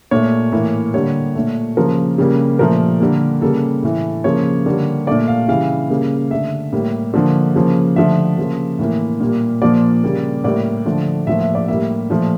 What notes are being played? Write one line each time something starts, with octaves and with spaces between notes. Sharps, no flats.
A#2 A3 C#5
A2 E3 A#3
D3 G3 A#3 C#5
A#2 A3
C#3 F3 A#3 A#4
C#3 G3 A#3
A#2 F3 A3 A#4
D3 G3 A#3
C#3 G3 A#3 A4
A2 E3 A3
C#3 F3 A#3 C#5
D3 G3 A#3
A#2 A3 D5
F5
C#3 E3 G3 F5
C#3 G3 A#3
D3 A3 E5
A2 G3 A#3
D3 F3 A#3
C#3 F3 A#3
D3 F3 A3 E5
C#3 F3 A#3
A2 E3 A#3
A#2 G3 A#3
A#2 F3 A#3 D5
C#3 G3 A#3
A2 G3 A#3 D5
D3 F3 A3
A2 F3 A#3 E5
E5
D5
A2 G3 A#3 E5
A#2 F3 A3